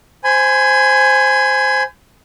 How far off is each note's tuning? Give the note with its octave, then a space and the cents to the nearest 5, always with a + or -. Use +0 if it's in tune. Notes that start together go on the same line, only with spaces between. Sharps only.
C5 +0 G#5 +0 B5 +45